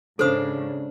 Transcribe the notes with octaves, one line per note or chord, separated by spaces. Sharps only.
G#2 C#3 D4 A4 C5 F5 D#6